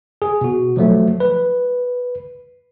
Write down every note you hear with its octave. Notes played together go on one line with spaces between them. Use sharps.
G#4
B2 F#4
F3 F#3 A3
B4